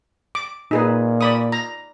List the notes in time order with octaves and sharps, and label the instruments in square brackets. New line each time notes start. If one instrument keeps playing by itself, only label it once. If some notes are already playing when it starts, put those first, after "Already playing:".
[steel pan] D6
[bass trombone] A#2 [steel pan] D#4 G#4 B4
[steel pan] D5 B5 D#6
A#5